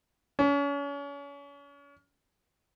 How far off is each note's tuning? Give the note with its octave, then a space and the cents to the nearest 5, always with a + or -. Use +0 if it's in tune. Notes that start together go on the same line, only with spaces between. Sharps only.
C#4 +35